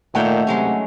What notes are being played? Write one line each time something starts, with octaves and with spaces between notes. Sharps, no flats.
A#2 D#3 A3 C#5 F#5 G5
C3 F#3 G#3 C#4